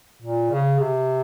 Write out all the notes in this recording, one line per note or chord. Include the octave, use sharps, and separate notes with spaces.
A#2
C#3
C3